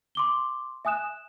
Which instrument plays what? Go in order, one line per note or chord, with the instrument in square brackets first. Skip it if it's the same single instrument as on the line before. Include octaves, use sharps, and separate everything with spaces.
[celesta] C6 D6 G7
E5 G#5 D#6 F#6 E7